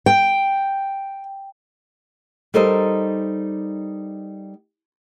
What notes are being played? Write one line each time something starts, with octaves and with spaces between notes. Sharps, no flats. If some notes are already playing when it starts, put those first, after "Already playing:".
G5
G3 D#4 A4 A#4 C5 D#5